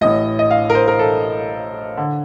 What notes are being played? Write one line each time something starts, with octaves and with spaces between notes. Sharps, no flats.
A1 A2 D#5
D#5
F5
A#4
C5
A#4
A4
D3